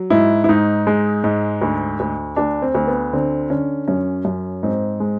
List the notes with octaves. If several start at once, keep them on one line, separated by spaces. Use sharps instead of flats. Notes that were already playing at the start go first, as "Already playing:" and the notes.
Already playing: F#3
G#2 E4
E4
G#2 D#4
G#3
G#2
D2
D2
D2 D4
C4
D2
B3
D3 C4
D3 C#4
F#2 C#4
F#2
G#2 C4
G#3